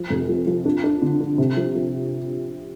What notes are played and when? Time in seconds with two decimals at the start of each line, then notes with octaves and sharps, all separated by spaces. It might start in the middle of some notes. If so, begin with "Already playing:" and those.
Already playing: F3
0.10 F1
0.29 F3
0.47 F3
0.65 D4
0.84 D4
1.02 D3
1.20 D4
1.38 C3
1.57 F3
1.75 F3